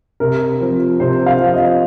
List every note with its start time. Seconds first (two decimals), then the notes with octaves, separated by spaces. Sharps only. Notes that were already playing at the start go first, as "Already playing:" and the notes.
0.20 C3 A#4
0.60 F3 C4
1.00 C3 C5
1.26 F5
1.39 F3 C4
1.54 D#5